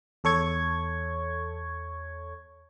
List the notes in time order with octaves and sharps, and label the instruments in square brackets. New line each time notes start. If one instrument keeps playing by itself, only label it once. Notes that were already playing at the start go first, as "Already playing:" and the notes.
[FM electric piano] E2 A4 C#5 C#6 G#6